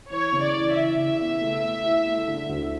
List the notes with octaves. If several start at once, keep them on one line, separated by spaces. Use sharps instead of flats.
E3 C#5
C#3
D5
E3
E3 E5
C#3
B3
A3
A3
E4
A3
D3
D2